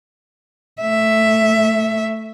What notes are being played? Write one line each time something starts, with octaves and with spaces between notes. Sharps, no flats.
A3 E5